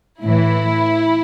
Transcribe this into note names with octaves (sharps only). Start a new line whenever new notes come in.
A2 E3 E4